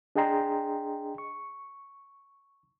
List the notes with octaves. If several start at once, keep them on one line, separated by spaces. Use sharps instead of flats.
D4 G#4 D#5 G5 A#5 C6
C#6